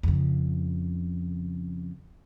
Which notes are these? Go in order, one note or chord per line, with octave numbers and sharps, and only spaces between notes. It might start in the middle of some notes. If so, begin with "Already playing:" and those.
F2 C#3